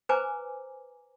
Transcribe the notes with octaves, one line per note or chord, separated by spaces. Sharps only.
B4 C5 G#5 A#5 D6